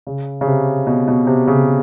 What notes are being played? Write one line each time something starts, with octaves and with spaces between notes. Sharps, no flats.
C#3
C#3
C3
B2
B2
C3
C#3